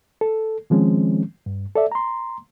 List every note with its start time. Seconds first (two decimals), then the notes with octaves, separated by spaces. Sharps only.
0.21 A4
0.70 D#3 F3 G#3 C4 C#4
1.46 G2
1.76 A4 D5 E5
1.92 A#5 C6